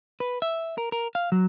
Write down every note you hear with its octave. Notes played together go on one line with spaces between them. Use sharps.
B4
E5
A#4
A#4
F5
F#3